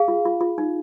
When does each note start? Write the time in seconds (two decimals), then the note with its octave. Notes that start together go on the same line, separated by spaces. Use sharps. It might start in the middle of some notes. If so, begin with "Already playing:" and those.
Already playing: G#4 F5
0.08 F4
0.25 F4
0.41 F4
0.58 D#4